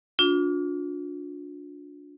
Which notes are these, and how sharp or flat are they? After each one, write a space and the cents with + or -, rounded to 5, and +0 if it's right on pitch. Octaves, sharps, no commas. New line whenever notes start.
D4 -20 F4 +40